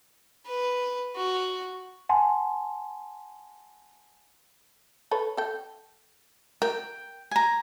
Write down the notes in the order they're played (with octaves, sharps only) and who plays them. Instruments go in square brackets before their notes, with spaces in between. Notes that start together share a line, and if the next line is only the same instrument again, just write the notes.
[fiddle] B4
F#4
[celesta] F#5 G#5 A5 C6
[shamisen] A4 B4 C#5
A4 G5
[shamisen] A#4 [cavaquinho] G5
[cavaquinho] G#5 A#5